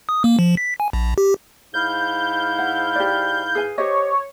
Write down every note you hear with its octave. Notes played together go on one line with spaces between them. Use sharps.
D#6
A#3
F3
B6
G#5
A#1
G4
G#2 E4 F5 G6
F#5
G4 D5
G#4 B4 G#5
G4 C5 C#5 D#5